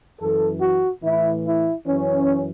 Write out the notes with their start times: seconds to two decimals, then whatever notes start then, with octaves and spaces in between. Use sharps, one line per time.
0.20 F#2 E3 A4
0.61 F#4
1.02 A2 E3 E4
1.44 E4
1.86 F#2 E3 C#4